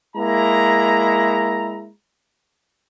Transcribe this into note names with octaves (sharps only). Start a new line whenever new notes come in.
G#3 A#3 E4 A#5